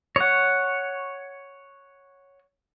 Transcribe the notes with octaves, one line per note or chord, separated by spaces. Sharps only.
C#5 F#5